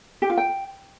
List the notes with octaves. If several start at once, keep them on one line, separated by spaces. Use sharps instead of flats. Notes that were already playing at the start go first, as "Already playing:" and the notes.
G4
F4
G5